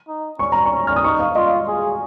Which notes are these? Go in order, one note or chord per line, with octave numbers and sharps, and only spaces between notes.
D#4
C#4 C#6
A#5
C#6
C#4
F6
D#6
D#4 C#6
F5
F4 D#5
G#4